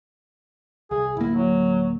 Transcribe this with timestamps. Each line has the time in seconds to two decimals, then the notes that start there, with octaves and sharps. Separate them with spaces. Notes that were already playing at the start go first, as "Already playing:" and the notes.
0.91 C2 G#4
1.17 D1 A#3 E4
1.35 F#3